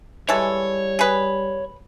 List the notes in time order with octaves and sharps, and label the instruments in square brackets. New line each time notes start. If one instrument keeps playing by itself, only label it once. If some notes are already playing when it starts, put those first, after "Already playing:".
[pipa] E3 G#3 A4 [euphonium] G3 [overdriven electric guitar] C#5
[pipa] G#4 B4